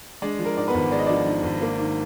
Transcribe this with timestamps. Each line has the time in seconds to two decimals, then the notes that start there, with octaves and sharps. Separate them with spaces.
0.22 G#3 D4 D5
0.39 F3
0.45 A#4
0.57 G#2 D5
0.68 B3 B4
0.75 G#1
0.91 G#3 D5
0.99 D#5
1.06 F3 D4 D5
1.26 G#2
1.43 G#1
1.62 A#3
1.79 D#3